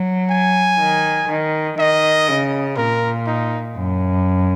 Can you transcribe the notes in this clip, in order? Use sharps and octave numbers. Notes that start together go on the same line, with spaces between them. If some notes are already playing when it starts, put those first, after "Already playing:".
Already playing: F#3
G#5
D#3
D#3
D#3 D#5
C#3
A#2 A#4
D#4
F#2